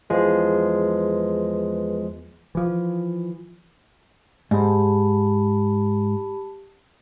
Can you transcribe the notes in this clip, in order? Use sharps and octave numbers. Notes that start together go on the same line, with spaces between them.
E2 F3 G#3 B4
E3 F3
G#2 G4 A5 B5